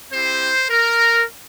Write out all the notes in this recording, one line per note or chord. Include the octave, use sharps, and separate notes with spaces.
C4 E4 G4 C5
A#4